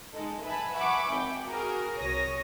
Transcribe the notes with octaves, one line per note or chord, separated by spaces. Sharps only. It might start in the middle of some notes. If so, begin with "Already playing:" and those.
G#3 D#4 A4
B4 E5 G#5 A5 B5
E5 F#5 G#5 B5 C#6 D6
G#1 G5
F#4 G#4 A#4
C2 C#5 D#6 A#6